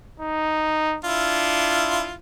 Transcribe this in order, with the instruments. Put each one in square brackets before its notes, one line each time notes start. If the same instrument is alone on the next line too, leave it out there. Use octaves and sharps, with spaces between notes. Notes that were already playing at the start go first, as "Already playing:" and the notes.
[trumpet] D#4
[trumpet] D4 [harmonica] E4 F4